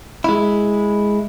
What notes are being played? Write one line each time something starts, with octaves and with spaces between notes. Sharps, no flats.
G#3 E4